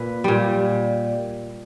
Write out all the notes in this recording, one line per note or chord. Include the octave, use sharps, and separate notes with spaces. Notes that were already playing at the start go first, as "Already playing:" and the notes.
Already playing: A#2 B4
A#2 G3